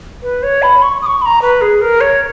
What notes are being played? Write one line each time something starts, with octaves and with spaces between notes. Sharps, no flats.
B4
C#5
B5
C#6
D#6
C#6
B5
A#5
B4
G#4
A#4
C#5